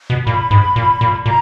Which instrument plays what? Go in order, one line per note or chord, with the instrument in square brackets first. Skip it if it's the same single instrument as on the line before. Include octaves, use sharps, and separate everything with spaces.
[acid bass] B2
[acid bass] A#2 [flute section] B5
[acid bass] G#2
A#2
A#2
[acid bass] A#2 [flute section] A#5